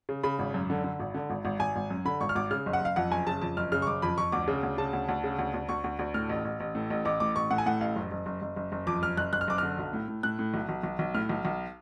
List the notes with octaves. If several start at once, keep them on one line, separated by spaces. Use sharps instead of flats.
C#3
C#3 B5
G#1
F#2
D3
D3
G#1
D3
G#1
G#1
G#1 G#5
G#1
F#2
D3 B5
G#1 C#6
F6
G#1 D6
C#3 F6
F#1
F#5
F#1 F5
F2 F#5
F#1 G#5
C#3 A5
F2 A5
F#1 F6
C#3 F6
C#6
F#1 D6
F2 B5
F2 C#6
D2 D6
C#3
D2
C#3 A5
D2
D2
C#3
D2
D2
D2 C#6
D2
D2
A2 F6
A1
A1
A1
A2
A1
A1 D6
A2 D6
A1 C#6
A2 F#5
G#5
A2 F#5
A1 F5
F#1
F#1
F#1
F#1
F#1
F#1
F2 D6
F#1 F6
F#1 F#6
F#1 F#6
F6
F#1 D6
D3 F6
B1
A2
A2
A2 F#6
A2
B1
B1
B1
B1
A2 F6
B1
B1